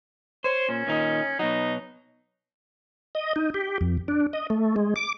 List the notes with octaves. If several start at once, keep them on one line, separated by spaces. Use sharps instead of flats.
C5 C#5
A#2 C#4
A#2 D#3 D#4
B2 F#3 D#4
D#5
D#4
G4
F2
D4
D#5
A3
G#3
D6